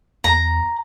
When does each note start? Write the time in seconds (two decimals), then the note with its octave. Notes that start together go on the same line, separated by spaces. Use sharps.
0.24 E2 A#5